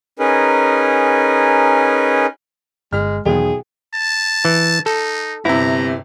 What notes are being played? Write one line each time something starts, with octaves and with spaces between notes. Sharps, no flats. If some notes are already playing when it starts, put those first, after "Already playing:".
C#4 D#4 G#4 A#4 B4
G1 G#3 F6
B1 E2 D#3 G#4
A5
E3
D#4 A4
G1 C3 E4 A#5